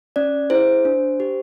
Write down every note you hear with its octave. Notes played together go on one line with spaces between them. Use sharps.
C#4 D5
E4 G#4 C5
D4
G4